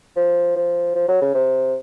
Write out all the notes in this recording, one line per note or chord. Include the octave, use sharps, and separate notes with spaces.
F3
F3
F3
F#3
C#3
C3